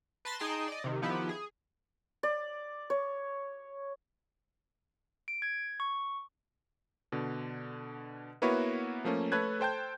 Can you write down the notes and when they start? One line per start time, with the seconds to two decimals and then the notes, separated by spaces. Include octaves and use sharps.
0.25 B4 A5 B5 C6 A6 A#6
0.39 D#4 G#4 G5 A5 C6
0.68 D5 D#5
0.84 C3 D#3
1.02 D#3 F3 B3 E4 G4 B4
1.29 G#4
2.23 D5
2.90 C#5
5.28 D7
5.42 G#6
5.80 C#6
7.12 B2 D3
8.42 A#3 B3 E4 F#4 B4 C#5
9.04 F3 A3 A#3 C#4
9.32 A3 A4 B4 C#5 F#6 G#6
9.60 A4 C5 G5 A5 G6